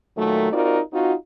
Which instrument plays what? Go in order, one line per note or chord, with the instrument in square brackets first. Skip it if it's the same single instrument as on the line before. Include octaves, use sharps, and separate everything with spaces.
[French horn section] A#2 D#3 F#3 A3
C4 D#4 F4 F#4 A#4 D5
C4 D#4 F4 F#4